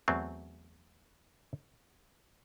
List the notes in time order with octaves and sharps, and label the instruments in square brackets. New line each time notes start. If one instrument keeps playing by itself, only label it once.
[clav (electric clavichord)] E2 F#3 A3 C4